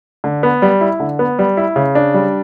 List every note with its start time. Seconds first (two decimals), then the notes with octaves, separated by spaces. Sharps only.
0.24 D3
0.43 B3
0.62 G3
0.81 E4
1.00 D3
1.19 B3
1.39 G3
1.57 E4
1.76 C#3
1.95 D4
2.14 G3